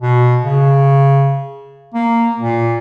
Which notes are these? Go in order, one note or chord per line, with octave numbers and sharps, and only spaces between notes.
B2
C#3
A#3
A#2